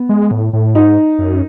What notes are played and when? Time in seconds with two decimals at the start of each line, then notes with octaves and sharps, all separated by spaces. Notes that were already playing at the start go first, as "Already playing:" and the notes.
Already playing: B3
0.09 G#3
0.31 A2
0.53 A2
0.75 G#2 D#4
1.19 F#2